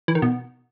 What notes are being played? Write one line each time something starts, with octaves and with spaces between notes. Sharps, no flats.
E3
D#3
B2